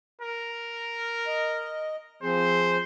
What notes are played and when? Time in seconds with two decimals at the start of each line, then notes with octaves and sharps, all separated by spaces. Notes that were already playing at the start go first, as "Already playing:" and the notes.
0.21 A#4
1.27 D#5
2.23 F3 C4 G#4 C5